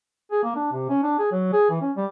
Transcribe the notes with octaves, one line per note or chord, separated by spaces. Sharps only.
G#4
A#3
D4
C3
C#4
D4
G#4
F#3
G#4
E3
C#4
G3